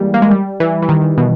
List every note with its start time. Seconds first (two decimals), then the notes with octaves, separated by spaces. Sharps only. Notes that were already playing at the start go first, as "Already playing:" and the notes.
Already playing: E3 G3 G#3 A#3
0.14 A#3
0.22 G#3
0.31 G3
0.60 E3
0.82 E3
0.89 D#3
1.18 B2